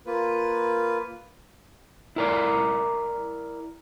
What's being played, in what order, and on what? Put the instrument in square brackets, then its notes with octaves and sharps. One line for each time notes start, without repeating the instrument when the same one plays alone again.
[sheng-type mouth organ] A#3 F4 B4
[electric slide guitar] E4 A#4 D5